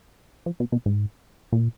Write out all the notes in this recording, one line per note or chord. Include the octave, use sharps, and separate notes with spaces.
F3
B2
B2
G#2
A#2